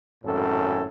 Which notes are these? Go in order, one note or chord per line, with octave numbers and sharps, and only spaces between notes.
G#1 F#2 A2 C#4 A4